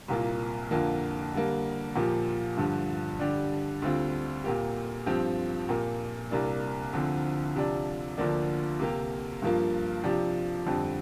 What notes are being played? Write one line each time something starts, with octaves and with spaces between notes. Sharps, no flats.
C2 A#2 A#3 F4
F2 D3 A#3 F4
D3 G3 A#3
A#2 F3 A#3 G4
G2 D3 F3
D3 G3 D4 G4
D2 D3 G3 C4 F4
A#2 A#3 G4
G2 F3 C4 G4
A#2 A#3 G4
C2 C3 A#3 D4
D2 D3 F3 C4
C3 F3 D4
D2 D3 F3 A#3 D4
C3 A#3 G4
G2 F3 A#3 F4
C3 F3 D4 G4
F2 D3 G3 C4